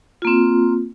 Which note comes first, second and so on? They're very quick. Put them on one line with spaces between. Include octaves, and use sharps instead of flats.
F4 A#3 C4